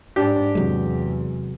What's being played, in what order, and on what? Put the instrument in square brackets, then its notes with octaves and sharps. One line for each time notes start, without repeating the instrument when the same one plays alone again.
[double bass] G#2 D4 [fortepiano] G4
[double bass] E2 [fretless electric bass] C3 F#3 G#3